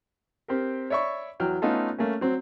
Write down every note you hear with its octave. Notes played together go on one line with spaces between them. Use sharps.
C4 G4 A#4
C#5 D5 E5 B5 C#6
E2 F#3 G5 F6
A3 B3 C#4 D#4 F4 A4
A3 A#3 C#4
F#3 C4